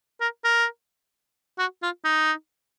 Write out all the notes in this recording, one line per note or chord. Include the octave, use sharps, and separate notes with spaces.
A#4
A#4
F#4
F4
D#4